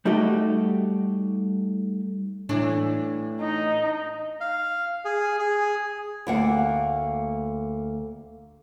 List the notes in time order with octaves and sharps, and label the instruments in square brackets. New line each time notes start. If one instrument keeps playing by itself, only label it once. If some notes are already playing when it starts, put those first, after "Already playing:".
[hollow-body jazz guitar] G3 A3 D#4 F#4 G4 D#5
[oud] A2 E3 D4
[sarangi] D#4
[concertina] F5
G#4
G#4
[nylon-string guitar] D2 A#3 F#5